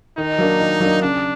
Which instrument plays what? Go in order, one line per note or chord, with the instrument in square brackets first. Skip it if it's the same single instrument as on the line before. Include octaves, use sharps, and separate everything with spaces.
[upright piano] D#3 [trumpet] D#4
[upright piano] F#3 A#3 D4
D#3
F#3 A#3 D4
[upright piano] C#3 [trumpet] D4